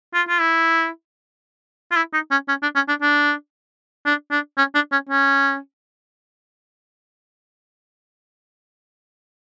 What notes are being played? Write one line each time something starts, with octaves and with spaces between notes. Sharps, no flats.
F4
F4
E4
F4
E4
D#4
C#4
C#4
D4
C#4
D4
D4
D4
D4
C#4
D4
C#4
C#4